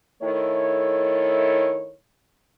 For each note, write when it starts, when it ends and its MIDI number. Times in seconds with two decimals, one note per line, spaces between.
0.23 1.93 51
0.23 1.93 57
0.23 1.93 64
0.23 1.93 69
0.23 1.93 73